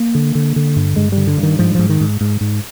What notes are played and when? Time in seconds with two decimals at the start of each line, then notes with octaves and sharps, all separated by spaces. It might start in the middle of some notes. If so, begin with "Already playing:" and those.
Already playing: A#3
0.15 D3
0.35 D3
0.56 D3
0.76 G2
0.96 G2 G#3
1.12 D3 G3
1.27 D3
1.37 G2
1.43 D#3
1.59 G#2 F3
1.75 G#2 F3
1.89 D#3
2.01 G#2
2.21 G#2
2.41 G#2